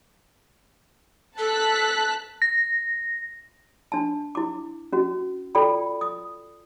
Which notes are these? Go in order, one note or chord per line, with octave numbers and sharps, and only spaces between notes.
A4 A5 F#6 B6
A#6
D4 A5
E4 D6
C#4 F#4
F4 A4 D5 G5 B5
D#6